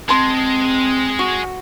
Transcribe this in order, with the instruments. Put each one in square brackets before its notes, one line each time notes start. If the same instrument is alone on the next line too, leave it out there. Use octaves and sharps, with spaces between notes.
[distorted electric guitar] G#3 [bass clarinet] C4 [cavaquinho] A5 C6
[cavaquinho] F#4